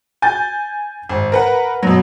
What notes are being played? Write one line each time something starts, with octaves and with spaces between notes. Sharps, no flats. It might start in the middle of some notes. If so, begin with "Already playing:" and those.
G#5 G6 A6
G#1
A#4 B4 F#5
B2 F#3